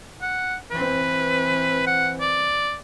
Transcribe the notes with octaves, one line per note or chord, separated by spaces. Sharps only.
F#5
E3 C4 B4
F#5
D5